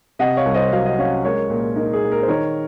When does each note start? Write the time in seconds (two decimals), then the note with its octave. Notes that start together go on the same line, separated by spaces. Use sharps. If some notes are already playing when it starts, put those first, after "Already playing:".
0.19 C3 D#5 F#5
0.37 C#5 F5
0.45 C2
0.54 C5 D#5
0.72 F#3 F5
0.86 D#5
0.98 C#4 C#5 F5
1.24 G#3 A#4 C#5
1.50 A#2
1.76 D#4 A#4
1.93 G#4
2.03 A#2
2.12 A#4
2.23 C5
2.28 D#3 A#4 C#5